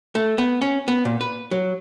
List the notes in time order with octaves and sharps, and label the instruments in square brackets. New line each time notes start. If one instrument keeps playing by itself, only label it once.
[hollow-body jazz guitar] A3
B3
C#4
B3
A#2
B4
F#3